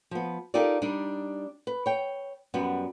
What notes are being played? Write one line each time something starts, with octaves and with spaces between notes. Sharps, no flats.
F3 B3
D#4 F4 G4 A4 A#4 D5
G3 D4 D#4
B4
C#5 G5
F#2 G3 B3 F#4